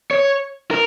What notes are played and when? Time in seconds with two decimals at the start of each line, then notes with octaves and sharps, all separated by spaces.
0.11 C#5
0.71 A#4